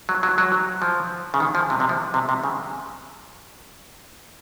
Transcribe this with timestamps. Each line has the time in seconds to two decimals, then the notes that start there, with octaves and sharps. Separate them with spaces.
0.09 F#3
0.23 F#3
0.38 F#3
0.82 F3
1.34 C#3
1.40 D#3
1.55 F3
1.70 C3
1.80 C3
1.89 F3
2.14 C3
2.29 C3
2.44 C#3